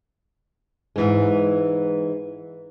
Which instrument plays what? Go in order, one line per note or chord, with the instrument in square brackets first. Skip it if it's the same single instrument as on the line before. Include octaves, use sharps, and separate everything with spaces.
[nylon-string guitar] G#2 E3 G#3